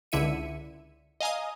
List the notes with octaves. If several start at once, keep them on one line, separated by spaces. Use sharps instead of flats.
C#2 D3 E4 E5 C#7 D#7
D#5 F5 G#5 A#5 D#6